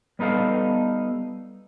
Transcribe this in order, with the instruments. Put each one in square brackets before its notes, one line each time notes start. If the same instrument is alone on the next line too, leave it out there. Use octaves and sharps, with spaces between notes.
[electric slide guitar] G3 B3 D#4 A4 F5